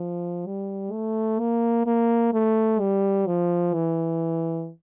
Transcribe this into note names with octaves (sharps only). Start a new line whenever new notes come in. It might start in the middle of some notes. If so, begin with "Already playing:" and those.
Already playing: F3
G3
A3
A#3
A#3
A3
G3
F3
E3